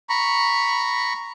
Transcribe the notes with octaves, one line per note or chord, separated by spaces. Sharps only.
A#5 B5 C#6